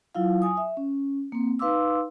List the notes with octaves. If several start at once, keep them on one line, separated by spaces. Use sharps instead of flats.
F#3 E4 F4 F5
G#5 D#6
E5
C#4
A#3 C4
D#4 B4 F5 C6 D6 E6